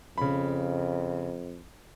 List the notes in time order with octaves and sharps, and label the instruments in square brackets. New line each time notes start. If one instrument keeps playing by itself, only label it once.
[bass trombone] F2 [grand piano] C#3 B5